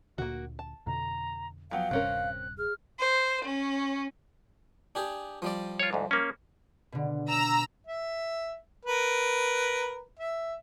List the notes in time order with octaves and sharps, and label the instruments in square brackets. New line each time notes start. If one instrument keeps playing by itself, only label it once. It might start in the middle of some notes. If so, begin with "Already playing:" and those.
[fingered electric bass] D2 A#2 D3 [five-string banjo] A#3 F#4
[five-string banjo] A5
[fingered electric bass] F2 B2 D3 [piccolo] A#5
[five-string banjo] F3 F#3 B3 [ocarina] F5 [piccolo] G5
[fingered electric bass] D#1 G2 C3 [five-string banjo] C4 C#4 A#4 [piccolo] F#6
[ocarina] G#4 [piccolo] F6
[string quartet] C5
C#4
[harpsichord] D4 G4 G#4
F3 G3 D5
[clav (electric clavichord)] F4 C#5
D2 G#2
A#3 C#4
[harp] B2 D3
[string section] A#5 E6
[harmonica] E5
A#4 B4
E5